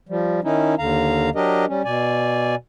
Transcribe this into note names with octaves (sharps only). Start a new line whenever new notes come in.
F3 G3
D#3 C#4 D#4 E4
D#2 D3 F5 A#5
F#3 D4 G4 A#4 D#5
G3 C#4
B2 D5 G#5